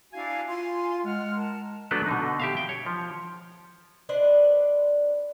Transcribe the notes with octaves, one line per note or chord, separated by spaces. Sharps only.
D4 E4 F#4 F5 G#5
F4 F5 G#5 C6
G#3 F#5 F6
A#4 A5
F#3 A3 B3 D4 A4 B4
B2 D3 D#4
G4 E5 F5
G5
C#5
F3
D4 B4 C5 D#5